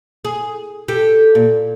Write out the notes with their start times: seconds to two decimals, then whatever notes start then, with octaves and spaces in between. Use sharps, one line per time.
0.25 G#4
0.88 G4 A4
1.35 A#2